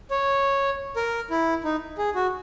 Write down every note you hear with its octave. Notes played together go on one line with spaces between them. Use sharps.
C#5
A#4
E4
D#4
G#4
F#4